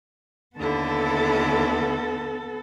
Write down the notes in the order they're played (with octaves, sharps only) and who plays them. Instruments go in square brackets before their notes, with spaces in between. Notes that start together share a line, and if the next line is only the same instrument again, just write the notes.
[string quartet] D#2 D3 E4 [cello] B3 A4